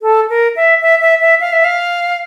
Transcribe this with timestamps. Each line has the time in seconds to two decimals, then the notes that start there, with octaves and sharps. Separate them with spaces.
0.02 A4
0.30 A#4
0.56 E5
0.82 E5
1.01 E5
1.21 E5
1.40 F5
1.53 E5
1.65 F5